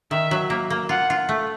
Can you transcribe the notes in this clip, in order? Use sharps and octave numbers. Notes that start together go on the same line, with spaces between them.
D#3 E5
F#3
A#3
A#3
F4 F#5
F4
A3